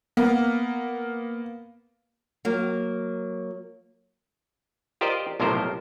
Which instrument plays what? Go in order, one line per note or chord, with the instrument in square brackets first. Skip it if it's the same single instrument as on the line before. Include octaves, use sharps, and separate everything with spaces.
[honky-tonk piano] A#3 B3 A#4
[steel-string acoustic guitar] F#3 A#3
[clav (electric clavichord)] F4 G4 A#4 C5 D5 D#5
B1 A2 C3 F3 A#4 C5